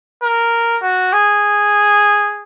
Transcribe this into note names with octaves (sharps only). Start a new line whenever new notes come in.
A#4
F#4
G#4